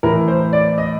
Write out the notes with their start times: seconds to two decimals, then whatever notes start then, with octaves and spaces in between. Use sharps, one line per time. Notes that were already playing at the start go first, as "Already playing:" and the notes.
0.03 A2 E3 A#4
0.28 C5
0.53 D5
0.78 D#5